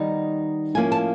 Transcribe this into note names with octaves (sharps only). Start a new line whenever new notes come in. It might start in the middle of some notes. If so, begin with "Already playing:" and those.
Already playing: D#3 G3 B3 D#4
A2 F3 A#3 C#4 G#5
A5